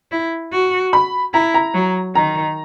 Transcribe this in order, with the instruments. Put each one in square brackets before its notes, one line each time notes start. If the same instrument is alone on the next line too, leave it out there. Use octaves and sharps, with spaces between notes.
[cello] E4
F#4
[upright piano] B5
[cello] E4 [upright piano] A#5
[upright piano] A#5
[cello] F#3
[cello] D#3 [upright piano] A#5